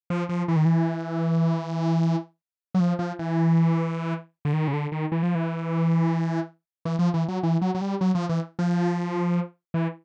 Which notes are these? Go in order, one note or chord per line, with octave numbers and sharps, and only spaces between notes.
F3
F3
E3
D#3
E3
F#3
F3
F3
E3
D3
D#3
C#3
D3
D#3
E3
F3
E3
E3
F3
E3
F#3
E3
F#3
F#3
G3
F#3
F3
E3
F3
E3